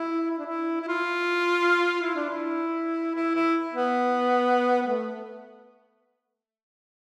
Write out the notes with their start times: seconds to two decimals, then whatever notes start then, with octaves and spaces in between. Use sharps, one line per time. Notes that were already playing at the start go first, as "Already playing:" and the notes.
Already playing: E4
0.31 E4
0.39 D4
0.46 E4
0.82 E4
0.88 F4
2.02 E4
2.16 D4
2.30 E4
3.16 E4
3.35 E4
3.74 B3
4.82 B3
4.87 A3